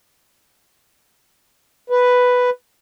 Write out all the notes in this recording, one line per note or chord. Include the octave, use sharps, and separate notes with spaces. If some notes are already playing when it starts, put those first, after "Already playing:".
B4